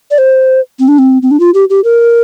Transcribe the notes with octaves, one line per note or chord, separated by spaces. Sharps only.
D5
C5
C4
D4
C4
C4
D4
F4
G4
G4
A#4